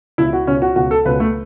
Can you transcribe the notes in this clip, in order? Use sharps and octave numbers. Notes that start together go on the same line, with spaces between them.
C#2 B2 E4
F#4
C#2 B2 C#4
F#4
C#2 B2 F#4
A4
C#2 B2 B4
A3